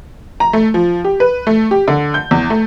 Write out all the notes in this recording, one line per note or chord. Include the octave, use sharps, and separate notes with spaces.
A#5
A3
F3
G4
B4
A3
G4
D3
G6
E2
A3